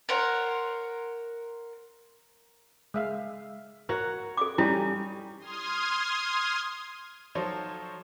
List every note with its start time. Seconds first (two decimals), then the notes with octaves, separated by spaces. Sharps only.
0.09 A#4 C5 C#5 F#5
2.94 G#3 E5 F5
3.89 F#4 A#4 C#5 F#5
4.37 A4 D6
4.58 G3 C#4 D#4 E4
5.39 C6 D#6 F6 G#6
7.35 F3 F#3 D#4 A4 C5 C#5